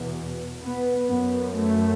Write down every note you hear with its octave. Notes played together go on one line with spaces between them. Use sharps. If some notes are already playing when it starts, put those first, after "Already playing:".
Already playing: E2 B2
B3
F#2 B3
A3